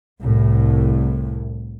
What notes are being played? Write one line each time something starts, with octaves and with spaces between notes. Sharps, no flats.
C2 A2